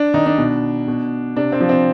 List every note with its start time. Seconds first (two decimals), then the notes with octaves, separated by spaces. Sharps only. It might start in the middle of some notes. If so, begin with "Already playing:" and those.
Already playing: D4
0.14 D#3 D#4
0.26 D4
0.38 B2
0.88 B2
1.36 C3 D4
1.52 C4
1.61 F3
1.69 C4